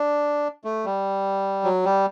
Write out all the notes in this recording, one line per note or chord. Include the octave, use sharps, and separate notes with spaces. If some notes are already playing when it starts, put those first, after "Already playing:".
Already playing: D4
A3
G3
F#3
G3